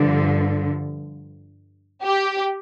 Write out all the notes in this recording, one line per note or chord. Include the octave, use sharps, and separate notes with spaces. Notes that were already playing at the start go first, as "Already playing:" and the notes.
Already playing: G2 D3 F3
G4